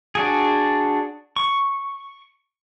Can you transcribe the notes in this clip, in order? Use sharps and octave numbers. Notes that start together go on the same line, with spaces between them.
D4 F#4 G#4
C#6